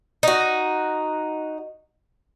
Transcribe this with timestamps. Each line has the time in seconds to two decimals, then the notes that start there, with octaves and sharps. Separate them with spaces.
0.23 D#4 F#4